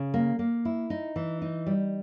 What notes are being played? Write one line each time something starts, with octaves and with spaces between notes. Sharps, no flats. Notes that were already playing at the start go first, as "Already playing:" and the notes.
Already playing: C#3
A#3
A#3
E4
D#4
E3
D#4
G3